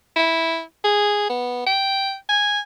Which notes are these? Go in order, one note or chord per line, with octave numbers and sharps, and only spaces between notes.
E4
G#4
B3
G5
G#5